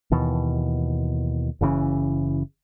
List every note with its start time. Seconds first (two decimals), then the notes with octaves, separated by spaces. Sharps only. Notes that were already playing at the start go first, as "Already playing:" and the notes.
0.11 D#2 B2 E3
1.61 F#1 C#3 E3 C#4